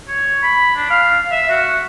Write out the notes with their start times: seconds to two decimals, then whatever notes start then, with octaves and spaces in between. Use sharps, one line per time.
0.08 C#5
0.43 B5
0.76 D4
0.90 F5
1.32 E5
1.50 F#4